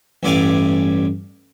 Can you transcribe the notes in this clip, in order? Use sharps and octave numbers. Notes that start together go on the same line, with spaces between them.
A1 G2 E4 D5 F5 G#5